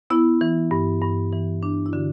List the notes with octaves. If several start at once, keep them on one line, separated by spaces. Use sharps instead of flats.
B3 E4
E3
G2
G2
E3
D4
E4
D3 F#4